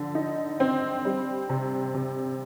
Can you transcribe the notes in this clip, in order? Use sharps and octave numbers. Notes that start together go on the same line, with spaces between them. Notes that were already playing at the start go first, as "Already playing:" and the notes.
Already playing: D3 F3
D#4
C4
G3
C3
C3